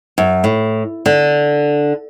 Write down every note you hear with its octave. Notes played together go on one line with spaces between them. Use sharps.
F#2
A2
D3